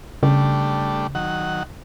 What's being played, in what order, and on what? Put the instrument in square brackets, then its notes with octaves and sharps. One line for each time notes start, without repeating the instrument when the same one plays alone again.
[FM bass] C#3 [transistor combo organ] G3 A3 D4
[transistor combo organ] D#3 F#3 F#5